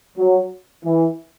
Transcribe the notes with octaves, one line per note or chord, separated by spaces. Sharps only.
F#3
E3